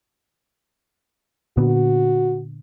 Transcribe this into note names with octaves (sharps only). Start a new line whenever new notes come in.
A#2 D3 B3 F#4